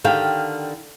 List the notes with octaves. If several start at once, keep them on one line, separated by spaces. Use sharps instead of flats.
D3 D#3 G4 F5 G5